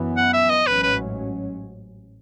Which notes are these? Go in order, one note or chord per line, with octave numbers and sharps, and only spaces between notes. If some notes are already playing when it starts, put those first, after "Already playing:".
Already playing: F#2 E3 B3
F#5
E5
D#5
A1 G#2 F#3 C#4 B4
B4